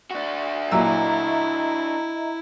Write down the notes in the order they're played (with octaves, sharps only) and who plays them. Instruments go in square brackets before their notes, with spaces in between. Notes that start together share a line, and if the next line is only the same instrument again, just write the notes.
[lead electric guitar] D4 F#4
[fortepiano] A#2 F#3 E6 [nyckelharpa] E4 [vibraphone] D#5 E5 A#5